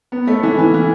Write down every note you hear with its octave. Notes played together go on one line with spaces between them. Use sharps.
B3
A3
E3
E3
E3